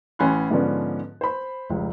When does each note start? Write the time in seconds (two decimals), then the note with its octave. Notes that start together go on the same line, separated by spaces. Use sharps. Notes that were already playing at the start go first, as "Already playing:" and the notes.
0.19 A1 C#4 G#5 B5 C6 F#6
0.51 G#2 D3 F3 B3 C#4 D4
1.21 C5 B5
1.70 F1 C#2